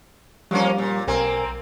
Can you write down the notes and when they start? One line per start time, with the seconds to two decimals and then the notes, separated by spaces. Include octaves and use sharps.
0.51 F3 G3 A#3 C#4
0.78 A#2
1.08 B1 A#3 C4 A#4 G#5